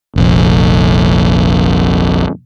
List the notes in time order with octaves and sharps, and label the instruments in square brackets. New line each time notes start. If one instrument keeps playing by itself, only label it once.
[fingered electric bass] F1 A#1